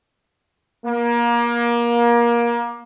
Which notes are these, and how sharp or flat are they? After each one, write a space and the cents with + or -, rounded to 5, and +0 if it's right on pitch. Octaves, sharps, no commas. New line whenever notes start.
A#3 +25